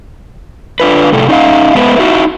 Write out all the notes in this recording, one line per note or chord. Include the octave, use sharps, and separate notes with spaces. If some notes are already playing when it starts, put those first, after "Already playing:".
D4 F4 B4
A2 C3 A4
C#4 D#4 B4 D#5 F5
G#3 B3 G#4 B4 C5 E5
D#4 E4 F#4